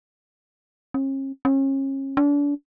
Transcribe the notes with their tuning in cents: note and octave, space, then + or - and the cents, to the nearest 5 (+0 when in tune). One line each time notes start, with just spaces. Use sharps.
C#4 -45
C#4 -35
D4 -35